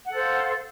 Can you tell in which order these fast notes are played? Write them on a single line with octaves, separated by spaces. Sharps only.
F#5 A4 C5 F5